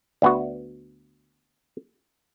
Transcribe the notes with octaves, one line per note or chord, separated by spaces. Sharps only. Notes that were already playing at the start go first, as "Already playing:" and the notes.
D2 B3 F#4